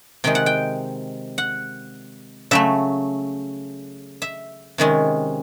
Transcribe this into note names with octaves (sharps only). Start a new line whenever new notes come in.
C3 D#3 G#3 G5
F#5
G5
F#5
C#3 F#3 A3 E5
E5
C3 D#3 G#3 C#4